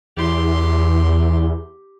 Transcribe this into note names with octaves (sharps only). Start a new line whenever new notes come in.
E2 G4 C6